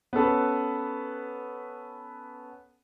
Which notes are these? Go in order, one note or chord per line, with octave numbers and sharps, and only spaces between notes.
B3 C#4 A4 B4